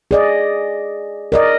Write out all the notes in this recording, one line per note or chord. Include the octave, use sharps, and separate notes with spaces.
G#4 D5 D#5
A#4 D5 D#5